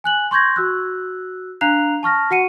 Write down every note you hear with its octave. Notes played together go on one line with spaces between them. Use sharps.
G#5 F#6 F#7
C6 C#6 G6 G#6 A#6
F#4 E6 F#6
D4 F5 A#5 F#6 C7 F7
A5 C#6 F6 A#6
F#4 F#5 C#7 D#7